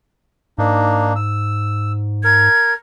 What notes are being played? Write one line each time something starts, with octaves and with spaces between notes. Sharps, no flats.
G#2 A#3 D4 D#4
E6
A#4 G#6